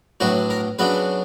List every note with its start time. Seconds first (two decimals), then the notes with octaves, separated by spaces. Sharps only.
0.20 A2 F#3 B3 D4 F#4
0.50 A#4
0.79 C#3 F#3 B3 D4 B4